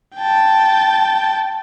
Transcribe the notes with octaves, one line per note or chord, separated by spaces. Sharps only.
G5 A5